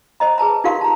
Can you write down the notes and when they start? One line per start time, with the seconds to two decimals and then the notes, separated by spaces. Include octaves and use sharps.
0.20 C5 D#5 A#5
0.38 G#4 B4 A5 A#5
0.64 D#4 F4 G4 A#4 F5 C6
0.81 A5 A#5